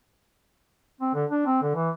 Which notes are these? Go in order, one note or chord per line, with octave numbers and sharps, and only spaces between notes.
C4
D3
D4
C4
D3
E3